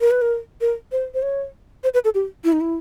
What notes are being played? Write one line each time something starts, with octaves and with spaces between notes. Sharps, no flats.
A#4
B4
A#4
A#4
C5
C5
C#5
C5
B4
A4
G4
E4
D#4
E4